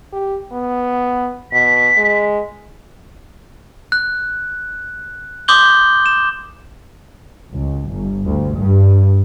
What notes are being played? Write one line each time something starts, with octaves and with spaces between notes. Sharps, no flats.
G4
B3
B2 B6
G#3
F#6
C6 D6 D#6 G6 F#7 G7
E7
C#2
G1
D2
G2